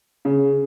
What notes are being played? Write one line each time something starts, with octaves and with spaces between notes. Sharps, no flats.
C#3